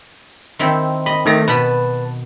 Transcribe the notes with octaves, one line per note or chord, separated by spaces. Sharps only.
D#3 C4 E4
D#5 B5
D#3 A3 A#6
B2 B4 A5 B5